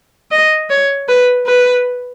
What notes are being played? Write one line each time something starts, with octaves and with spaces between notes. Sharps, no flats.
D#5
C#5
B4
B4